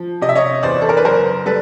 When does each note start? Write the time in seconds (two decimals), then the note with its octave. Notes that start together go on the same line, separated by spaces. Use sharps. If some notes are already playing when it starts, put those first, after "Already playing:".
Already playing: F3
0.21 C3 D#5
0.29 E5
0.35 C#5 D#5
0.63 E2 C5 D5
0.81 A4
0.89 A#4
0.97 B4
1.05 F#1 A#4 C5
1.46 G3 A4 B4